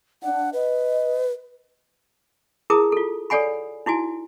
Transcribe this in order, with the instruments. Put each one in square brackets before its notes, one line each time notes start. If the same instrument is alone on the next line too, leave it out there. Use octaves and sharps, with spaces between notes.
[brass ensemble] D4 [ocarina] F#5
[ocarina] B4 [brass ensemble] D#5
[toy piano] E4 G#4 A#4 A5 A#5 D#6
F4 A4
A4 C#5 D5 F#5 G#5 B5
D#4 E4 F#4 G#5